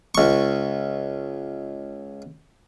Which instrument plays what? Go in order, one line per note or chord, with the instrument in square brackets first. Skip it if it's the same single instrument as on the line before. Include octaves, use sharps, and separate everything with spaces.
[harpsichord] C#2 C#6